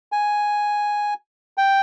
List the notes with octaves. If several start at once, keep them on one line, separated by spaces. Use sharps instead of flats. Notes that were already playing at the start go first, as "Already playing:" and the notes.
G#5
G5